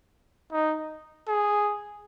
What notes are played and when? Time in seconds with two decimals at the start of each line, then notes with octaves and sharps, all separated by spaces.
0.52 D#4
1.28 G#4